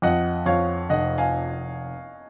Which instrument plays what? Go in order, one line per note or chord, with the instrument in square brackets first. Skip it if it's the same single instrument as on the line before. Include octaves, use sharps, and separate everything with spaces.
[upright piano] F2 [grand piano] D#5 F#5
[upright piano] F2 [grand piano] C#5 F5
[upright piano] F1 [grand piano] D#5 F#5
[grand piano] F5 G#5